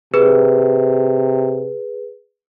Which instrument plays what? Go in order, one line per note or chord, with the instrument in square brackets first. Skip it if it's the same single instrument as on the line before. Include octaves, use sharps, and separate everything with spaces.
[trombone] C3 [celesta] G#4 B4